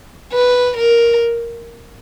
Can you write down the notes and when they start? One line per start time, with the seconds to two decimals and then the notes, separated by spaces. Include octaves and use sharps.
0.33 B4
0.77 A#4